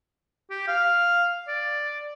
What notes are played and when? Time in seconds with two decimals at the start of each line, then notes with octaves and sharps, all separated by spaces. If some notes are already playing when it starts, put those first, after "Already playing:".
0.50 G4
0.68 F5
1.48 D5